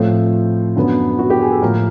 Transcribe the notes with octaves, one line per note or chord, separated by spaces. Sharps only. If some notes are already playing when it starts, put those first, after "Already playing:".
Already playing: A2 F3 A3 C4 C5
F#2 D3 F#3 B3
F#4
G4
G#4
A4
A2 F3 A#3 A#4